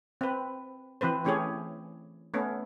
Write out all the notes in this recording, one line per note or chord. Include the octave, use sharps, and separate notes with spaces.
C4 B4
E3 C4 B4 C5
E3 A3 C#4 G4 G#4 C#5
A3 B3 C#4